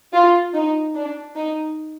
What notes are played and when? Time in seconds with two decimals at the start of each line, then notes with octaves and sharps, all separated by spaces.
0.13 F4
0.54 D#4
0.95 D4
1.36 D#4